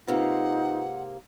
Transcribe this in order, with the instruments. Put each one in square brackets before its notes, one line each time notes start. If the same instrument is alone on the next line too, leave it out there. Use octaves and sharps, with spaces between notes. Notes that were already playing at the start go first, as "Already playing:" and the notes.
[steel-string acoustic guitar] G#2 C3 A#3 [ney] D#4 [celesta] F4 B4 [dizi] F#5